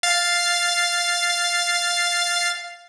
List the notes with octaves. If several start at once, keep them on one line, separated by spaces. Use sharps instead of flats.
F5 A6 C7